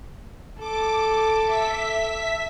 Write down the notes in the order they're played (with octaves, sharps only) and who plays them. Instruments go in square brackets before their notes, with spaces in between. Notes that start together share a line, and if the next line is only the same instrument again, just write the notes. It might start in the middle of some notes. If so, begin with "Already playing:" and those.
[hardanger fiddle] A4 [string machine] D6
[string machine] E5 B6